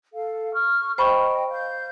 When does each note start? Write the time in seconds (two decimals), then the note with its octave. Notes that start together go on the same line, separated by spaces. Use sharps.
0.13 A4 F5
0.54 C#6 F6
0.98 C5 D#5 G5 B5 C#6
1.51 F5 G6